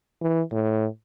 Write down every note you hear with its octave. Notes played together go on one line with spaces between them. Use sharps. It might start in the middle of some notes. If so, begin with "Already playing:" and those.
E3
A2